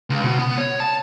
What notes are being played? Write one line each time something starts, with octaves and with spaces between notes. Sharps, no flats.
C#2
B2
B3
C#5
A5